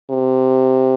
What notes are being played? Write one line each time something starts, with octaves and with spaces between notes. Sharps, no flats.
C3